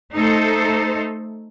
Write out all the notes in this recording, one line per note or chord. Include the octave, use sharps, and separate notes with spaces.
A3 D#4 A4 C5